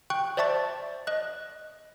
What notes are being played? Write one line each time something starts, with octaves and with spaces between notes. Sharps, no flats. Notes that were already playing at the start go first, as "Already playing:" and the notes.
G5 C#6 F#6
C5 D5 E5 A5 C#6 A6
D#5 F#6